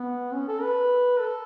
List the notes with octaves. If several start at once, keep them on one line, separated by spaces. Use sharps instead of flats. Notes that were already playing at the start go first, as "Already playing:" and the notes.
Already playing: B3
C#4
A4
B4
A4